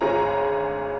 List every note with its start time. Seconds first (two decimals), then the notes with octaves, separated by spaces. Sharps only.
0.01 G#1 D2 G#4 C#5 A#5